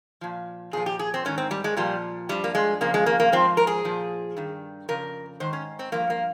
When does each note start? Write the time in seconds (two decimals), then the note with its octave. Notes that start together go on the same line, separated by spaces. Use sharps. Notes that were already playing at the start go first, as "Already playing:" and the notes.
0.21 A#2 F3
0.73 A#2 F3 G#4
0.86 G4
0.99 G#4
1.14 C4
1.25 G#2 D#3 C#4
1.38 C4
1.51 G3
1.64 G#3
1.77 A#2 F3 G3
2.29 G2 F3 G3
2.44 A#3
2.55 G#3
2.81 F2 C#3 F3 A#3
2.94 G#3
3.06 A#3
3.20 A#3
3.32 G#2 F3 C4
3.57 A#4
3.67 G#4
3.85 A#2 F3
4.37 G2 D#3
4.89 F2 C#3 A#4
5.40 G#2 D#3 C5
5.53 C#4
5.79 C4
5.92 G2 F3 A#3
6.10 A#3